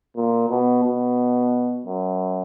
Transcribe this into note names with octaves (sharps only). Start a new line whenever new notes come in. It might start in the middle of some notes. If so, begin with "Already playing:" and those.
A#2
B2
B2
F#2